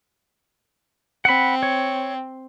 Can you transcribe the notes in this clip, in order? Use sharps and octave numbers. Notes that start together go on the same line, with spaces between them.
C4 F#5 B5
C#5